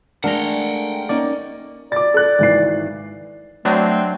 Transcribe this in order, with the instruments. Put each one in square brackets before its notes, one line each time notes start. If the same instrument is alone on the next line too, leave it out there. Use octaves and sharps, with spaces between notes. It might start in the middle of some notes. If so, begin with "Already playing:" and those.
[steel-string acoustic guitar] G#3 A3 [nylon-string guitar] D4 [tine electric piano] A#4 A#5 [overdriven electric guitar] F#5 G5
[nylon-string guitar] A#3 C#4 D#4 [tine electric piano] D5
[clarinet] D5 [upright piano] D6 A6
[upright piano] A4 F#6
G#1 E3 C7
[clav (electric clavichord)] F#3 D4 [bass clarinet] A3 [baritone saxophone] C4